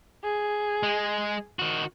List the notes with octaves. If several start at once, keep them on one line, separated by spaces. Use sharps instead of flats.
G#4
G#3
D#3 F#4